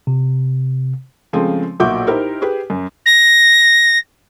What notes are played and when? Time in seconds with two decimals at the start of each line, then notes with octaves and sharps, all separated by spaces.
0.07 C3
1.33 C#3 F3 G#3 A3 C4
1.80 B1 A#2 F#4 E5 D6 G6
2.07 D#4 E4 G4 A#4 C5
2.42 G4 G#4 B4
2.70 F#2
3.06 A#6